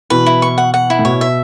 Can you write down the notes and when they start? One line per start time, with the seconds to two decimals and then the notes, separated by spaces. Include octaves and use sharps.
0.10 B2 E3 B4
0.26 E4
0.42 C#6
0.58 F#5
0.74 F#5
0.90 E4
0.99 A2
1.05 B2 C#5
1.21 E5